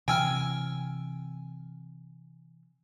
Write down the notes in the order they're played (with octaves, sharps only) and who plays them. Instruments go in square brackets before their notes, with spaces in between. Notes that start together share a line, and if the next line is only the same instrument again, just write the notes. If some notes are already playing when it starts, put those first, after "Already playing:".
[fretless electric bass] C3 E3 C4 [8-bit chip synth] G5 E6 F6 [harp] G#5